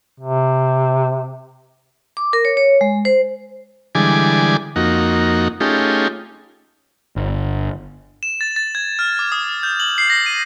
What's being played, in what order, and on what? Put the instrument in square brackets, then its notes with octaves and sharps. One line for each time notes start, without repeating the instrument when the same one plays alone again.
[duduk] C3
[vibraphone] D6
A#4
C#5
C#5
G#3
C5
[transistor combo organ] D3 E3 G3 G#3 G#5 D6
F2 A#3 D#4 F#4
A3 C#4 D#4 F4 G4 G#4
[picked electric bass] G1
[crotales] E7
A6
A6
G#6
F6
D6
D#6
G6
F#7
C7
A#6
D#7